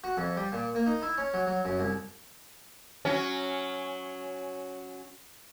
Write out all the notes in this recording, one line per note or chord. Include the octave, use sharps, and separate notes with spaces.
F#4
F2
G3
A#2
A#3
D#4
E4
C#4
F#3
F#3
F#2
C2
F#3 C#4